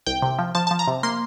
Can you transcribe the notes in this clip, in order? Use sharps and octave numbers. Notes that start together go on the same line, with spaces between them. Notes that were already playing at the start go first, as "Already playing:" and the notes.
C2 G5
C3
F3
F3 A5
A5
F3
A#5
C3
A#3 C6